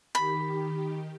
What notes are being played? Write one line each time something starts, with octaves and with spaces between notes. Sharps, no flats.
D#3 G4 B5